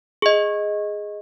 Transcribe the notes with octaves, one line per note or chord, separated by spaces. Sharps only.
G#4 D#5